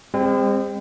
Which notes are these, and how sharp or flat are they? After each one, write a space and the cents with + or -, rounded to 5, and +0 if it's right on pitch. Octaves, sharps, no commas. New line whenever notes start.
G#3 -40 C4 +0